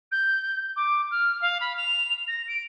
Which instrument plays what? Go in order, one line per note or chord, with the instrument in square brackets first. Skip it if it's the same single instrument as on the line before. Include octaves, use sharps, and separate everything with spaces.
[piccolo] G6
D6
F6
F5
B5
F7
A#6
D7